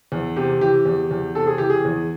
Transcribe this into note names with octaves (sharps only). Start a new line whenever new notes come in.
E2
C3 G4
E3 G4
E2
E2
C3 A4
G#4
E3 G4
G#4
E2